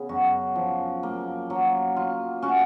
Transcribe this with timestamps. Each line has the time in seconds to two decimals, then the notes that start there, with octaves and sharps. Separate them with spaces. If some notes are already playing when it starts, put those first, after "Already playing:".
Already playing: C#3 B3 G#4
0.09 F#2 F#4
0.56 F3
1.03 A#3
1.50 F#3
1.96 F4
2.42 C#4 F#4